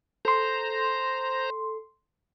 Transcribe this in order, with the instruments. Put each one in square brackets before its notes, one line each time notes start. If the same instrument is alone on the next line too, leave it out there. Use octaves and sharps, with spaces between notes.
[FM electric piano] A4 C6 [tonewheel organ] C5 A#5